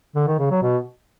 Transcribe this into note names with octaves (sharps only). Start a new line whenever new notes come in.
D3
D#3
C#3
F#3
B2